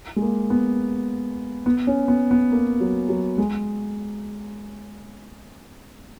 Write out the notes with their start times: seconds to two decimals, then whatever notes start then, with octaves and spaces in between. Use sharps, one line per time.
0.16 G#3
0.22 A#3
0.50 B3
1.66 B3
1.87 C#4
2.08 B3
2.31 B3
2.52 A#3
2.81 F#3
3.09 F#3
3.38 G#3